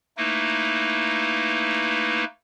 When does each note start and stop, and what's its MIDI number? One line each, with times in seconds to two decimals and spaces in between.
0.17 2.24 57
0.17 2.24 58
0.17 2.24 63
0.17 2.24 64
0.17 2.24 71